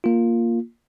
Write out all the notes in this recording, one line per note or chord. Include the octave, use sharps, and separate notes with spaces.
A#3 F4